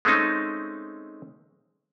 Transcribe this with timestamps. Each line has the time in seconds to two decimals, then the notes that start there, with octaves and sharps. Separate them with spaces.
0.05 G#3 A3 C4 C#4 D#4